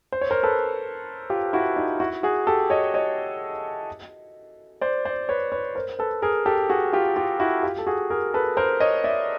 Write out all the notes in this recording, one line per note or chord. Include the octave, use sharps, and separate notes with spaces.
C5
C#5
A#4 C5
A4 B4
F4 G4
E4 F#4
D#4 F4
E4 F#4
F#4 G#4
G4 A4
C#5 D#5
C#5 D#5
C5 D5
C5 D5
B4 C#5
B4 C#5
A#4 C5
A4 B4
G#4 A#4
G4 A4
F#4 G#4
F4 G4
F4 G4
E4 F#4
F4 G4
A4
F#4 G#4
G#4 A#4
A4 B4
A#4 C5
C#5 D#5
D5 E5